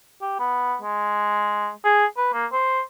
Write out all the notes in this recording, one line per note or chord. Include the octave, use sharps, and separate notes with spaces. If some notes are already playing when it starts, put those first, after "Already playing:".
G4
B3
G#3
G#4
B4
A#3
C5